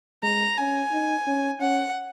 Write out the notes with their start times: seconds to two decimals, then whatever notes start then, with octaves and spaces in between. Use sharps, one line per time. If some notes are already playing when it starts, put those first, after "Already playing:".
0.23 G#3 A#5
0.58 C#4 G#5
0.92 D#4
1.27 C#4
1.60 C#4 F#5